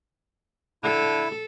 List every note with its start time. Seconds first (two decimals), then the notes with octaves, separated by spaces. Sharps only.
0.83 D3 E4 A4